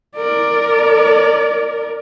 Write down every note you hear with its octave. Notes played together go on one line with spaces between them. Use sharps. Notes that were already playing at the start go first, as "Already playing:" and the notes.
A#4 D5